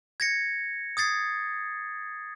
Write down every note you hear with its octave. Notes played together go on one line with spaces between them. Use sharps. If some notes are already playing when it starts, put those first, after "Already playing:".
G#6 A#6 C#7
D#6 G#6 A6 C7